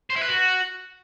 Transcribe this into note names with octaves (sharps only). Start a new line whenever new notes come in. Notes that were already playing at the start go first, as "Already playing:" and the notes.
C5
E4
B4
F#4